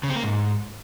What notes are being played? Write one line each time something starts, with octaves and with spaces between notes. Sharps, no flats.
C#3
C4
A#3
G#2